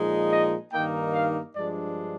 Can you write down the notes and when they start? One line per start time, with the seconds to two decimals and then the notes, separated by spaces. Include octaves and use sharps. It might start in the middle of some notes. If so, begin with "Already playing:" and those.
Already playing: A#2 F3 G#3 D#4
0.31 D#5
0.72 G2 D#3 A#3 D#4 G5
1.13 F5
1.55 G2 F3 G#3 D4 D5